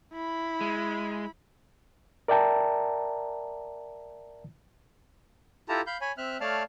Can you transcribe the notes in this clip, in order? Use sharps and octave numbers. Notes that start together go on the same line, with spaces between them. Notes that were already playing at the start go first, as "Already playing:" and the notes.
E4 B5
G#3
A#4 D5 E5 G5 A5 A#5
E4 F4 G4 A4 A5 A#5
F5 B5 G6
C#5 G#5 B5
C4 E5 F6 F#6
A3 C#5 D5 F5 A5 F6